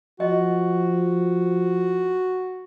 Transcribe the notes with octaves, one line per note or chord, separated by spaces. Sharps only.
F3 F#4 D#5